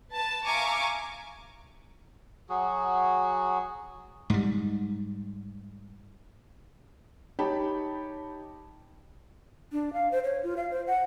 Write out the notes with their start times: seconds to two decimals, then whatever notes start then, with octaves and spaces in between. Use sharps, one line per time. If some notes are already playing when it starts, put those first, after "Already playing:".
0.11 B4 A5
0.45 E5 F5 G#5 A#5 C#6 D6
2.49 F#3 F#4 G#4
4.30 G#2 G3
7.39 D#4 G4 C#5 G5 A5 B5
9.72 D4
9.93 F5
10.12 C5
10.24 C#5
10.43 F4
10.57 F5
10.71 C5
10.87 F#5